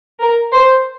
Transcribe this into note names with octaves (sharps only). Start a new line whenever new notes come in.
A#4
C5